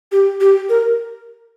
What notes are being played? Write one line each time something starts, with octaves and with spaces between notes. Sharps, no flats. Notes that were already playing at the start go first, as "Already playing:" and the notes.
G4
G4
A#4